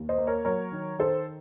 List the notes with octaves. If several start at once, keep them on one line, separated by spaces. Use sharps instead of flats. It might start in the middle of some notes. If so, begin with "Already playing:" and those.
Already playing: D#2
C5 D#5
A#3
A#4 C#5
F#3 A#4 C#5
D#3
D#3 A4 C5